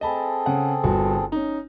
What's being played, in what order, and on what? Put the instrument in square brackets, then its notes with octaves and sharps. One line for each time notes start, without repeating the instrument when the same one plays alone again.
[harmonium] C4 G#4 A4 [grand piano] D#5 A5 B5
[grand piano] C#3 F#5
G1 F#4
C#4 D#4